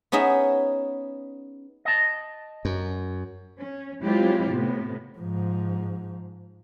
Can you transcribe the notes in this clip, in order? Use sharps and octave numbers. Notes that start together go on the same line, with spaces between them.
B3 C#4 D#4 G#4 E5
D#5 A5
F#2
C#4
F#3 G#3 C4 E4 F4 G4
A2 C3 B3
G#2 F3